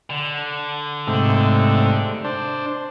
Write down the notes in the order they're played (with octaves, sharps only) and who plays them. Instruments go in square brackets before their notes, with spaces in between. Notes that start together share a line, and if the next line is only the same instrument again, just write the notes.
[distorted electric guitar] D3
[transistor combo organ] G#2 C3 A3
D4 C5